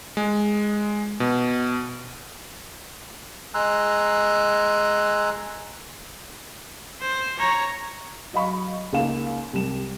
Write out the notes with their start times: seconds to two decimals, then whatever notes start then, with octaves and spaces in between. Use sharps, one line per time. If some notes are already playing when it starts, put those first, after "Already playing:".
0.17 G#3
1.20 B2
3.54 G#3 G#5 A#5 C6 E6 F#6
7.01 C5
7.39 C#5 A#5
8.33 F#3 D#5 F5 B5 C#6
8.93 C#2 A#3 D#4 F5 E7
9.53 C2 G3 E7